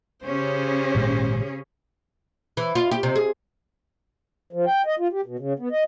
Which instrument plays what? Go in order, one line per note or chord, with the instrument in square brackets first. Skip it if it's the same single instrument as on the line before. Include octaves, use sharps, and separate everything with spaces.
[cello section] C#3 C#4 G#4 [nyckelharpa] G4 C5
[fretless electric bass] G#1 A#2 G#3
[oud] E3
F4
G4
C3
G#4
[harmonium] F3
G5
D#5
F4
G4
B2
C#3
B3
D#5